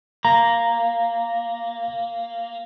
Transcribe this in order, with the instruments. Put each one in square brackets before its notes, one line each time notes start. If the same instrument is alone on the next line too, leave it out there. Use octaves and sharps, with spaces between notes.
[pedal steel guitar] A#3 [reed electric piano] A#5